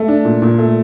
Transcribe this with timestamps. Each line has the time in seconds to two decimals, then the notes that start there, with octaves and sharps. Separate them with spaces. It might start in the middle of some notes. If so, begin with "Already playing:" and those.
Already playing: A3
0.08 D4
0.25 A#2
0.42 A#2
0.58 A3